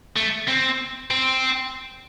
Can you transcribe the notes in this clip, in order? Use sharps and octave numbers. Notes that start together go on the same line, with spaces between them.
A3
C4
C4